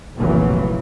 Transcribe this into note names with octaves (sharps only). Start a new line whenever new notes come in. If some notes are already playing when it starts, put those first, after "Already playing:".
F1 B1 A#2 C#3 E3 F#3